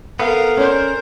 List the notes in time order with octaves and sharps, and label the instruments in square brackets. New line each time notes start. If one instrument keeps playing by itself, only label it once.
[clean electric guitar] B3 [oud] A4 [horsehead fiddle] A#4 F5
[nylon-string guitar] C#4 D5 [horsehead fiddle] A#4 C5